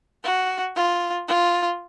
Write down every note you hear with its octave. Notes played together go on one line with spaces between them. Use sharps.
F#4
F4
F4